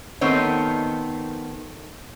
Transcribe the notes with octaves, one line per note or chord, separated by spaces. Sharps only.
D#3 A3 B3 C4 C#5